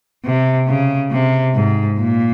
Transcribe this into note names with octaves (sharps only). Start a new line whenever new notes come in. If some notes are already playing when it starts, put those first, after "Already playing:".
C3
C#3
C3
G#2
A#2